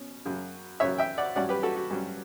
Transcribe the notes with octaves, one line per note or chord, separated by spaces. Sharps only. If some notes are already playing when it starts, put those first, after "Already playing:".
Already playing: B2 C#4
F#2 C#3 F#3
F#2 C#3 F#3 C#5 E5
E5 G5
D5 F#5
G2 F#3 C#4 D5 F#5
G4 B4
F#4 A4
F#4
G2 F#3 C#4